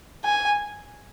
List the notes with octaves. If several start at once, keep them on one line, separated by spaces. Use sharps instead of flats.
G#5